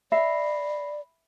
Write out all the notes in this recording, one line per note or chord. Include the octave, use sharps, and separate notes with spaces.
D5 E5 B5 A#6 C7